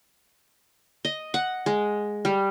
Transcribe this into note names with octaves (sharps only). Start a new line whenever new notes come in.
D#5
F#5
G#3
G3